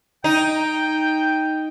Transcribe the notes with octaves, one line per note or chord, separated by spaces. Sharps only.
D#4 G5